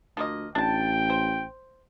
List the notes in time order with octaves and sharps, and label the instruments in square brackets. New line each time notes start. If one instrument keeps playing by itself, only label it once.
[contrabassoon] D2 [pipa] F3 A#3 D#5
[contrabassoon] A1 [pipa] D4 A5 [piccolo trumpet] G5
[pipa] C5